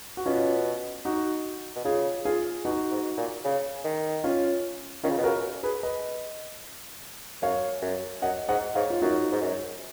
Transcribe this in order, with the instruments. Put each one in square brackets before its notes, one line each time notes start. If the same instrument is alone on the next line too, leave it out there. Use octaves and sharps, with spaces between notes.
[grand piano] F#4
[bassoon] B2 [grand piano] C#4 F4
[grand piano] D#4 F#4
[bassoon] B2
[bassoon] C#3 [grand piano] F4 G#4
[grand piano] F4 G#4
[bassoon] B2 [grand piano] D#4 F#4
[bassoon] G#2
A#2
C#3
D#3
[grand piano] C#4 F4
[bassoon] D#3 [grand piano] C#4 F4
[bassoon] C#3
B2
[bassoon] C#3 [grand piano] F#4 A#4
[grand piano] G#4 B4
B4 D#5
[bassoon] F#2 [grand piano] C#5 F5
[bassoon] F#2
[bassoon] F#2 [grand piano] D#5 F#5
[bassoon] G#2 [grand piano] D#5 F#5
[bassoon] G#2 [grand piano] C#5 F5
[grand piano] F4
[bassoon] F#2 [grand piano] D#4 F#4
[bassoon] G#2
F#2